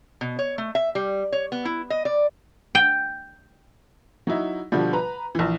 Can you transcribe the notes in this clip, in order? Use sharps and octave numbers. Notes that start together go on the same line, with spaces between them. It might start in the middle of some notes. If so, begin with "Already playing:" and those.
B2
C#5
A3
E5
G3
C#5
B3
E4
D#5
D5
G5
F#3 D#4 E4
B2 D3 F3 G3
B4 A#5
A#1 E3